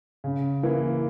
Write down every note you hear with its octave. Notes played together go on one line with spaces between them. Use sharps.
C#3
E3 A#3